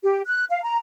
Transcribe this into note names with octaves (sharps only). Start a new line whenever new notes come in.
G4
F#6
F5
A#5